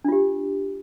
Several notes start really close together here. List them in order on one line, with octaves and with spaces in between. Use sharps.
D4 F4 G4